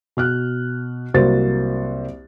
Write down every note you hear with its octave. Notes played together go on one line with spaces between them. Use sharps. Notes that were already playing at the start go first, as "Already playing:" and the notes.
B2 F6 F#6
C2 F#3 A#3 C5 A6